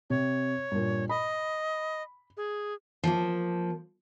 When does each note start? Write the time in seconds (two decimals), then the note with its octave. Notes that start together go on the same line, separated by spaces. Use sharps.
0.10 C3 C#5
0.72 G2 A#2
1.09 D#5 B5
2.37 G#4
3.04 F3 A#3